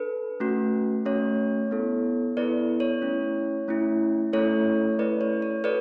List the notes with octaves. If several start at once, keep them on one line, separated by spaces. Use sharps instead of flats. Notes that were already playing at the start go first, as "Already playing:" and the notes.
Already playing: D4 A4 B4
A3 C#4 F#4
A3 C#4 F#4 C#5
B3 E4 A4
B3 E4 A4 B4 D5
C#5
A3 C#4 E4
A3 C#4 E4
A3 C#4 E4 A4 C#5
A3 C#4 E4 A4 B4 D5
C#5
C#5
F#4 A4 B4 D5